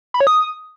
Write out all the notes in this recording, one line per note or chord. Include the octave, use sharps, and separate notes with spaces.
B5
C#5
D#6